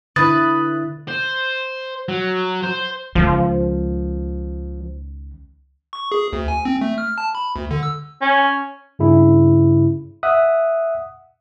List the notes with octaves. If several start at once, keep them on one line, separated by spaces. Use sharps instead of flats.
D3 E4 B4 D#6 A6
C5
F#3
C5
C#2 D#3 F3
C#6
G#4
D2
G#5
C4
A3
F6
A5
B5
D2
D3
E6
C#4
G2 C#3 E4
E5 F#5 D#6 F#6